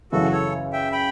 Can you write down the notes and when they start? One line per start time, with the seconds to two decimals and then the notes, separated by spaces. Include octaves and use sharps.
0.12 F#2 C#3 E3 F#4 A4
0.32 A4 C#5
0.73 E5 G5
0.92 G5 B5